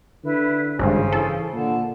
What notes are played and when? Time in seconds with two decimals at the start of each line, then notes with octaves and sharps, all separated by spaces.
0.24 D3 E4 B4
0.79 G#1 G2 C#3 C5 G#5
1.13 E3 A4
1.53 A#2 D3 A5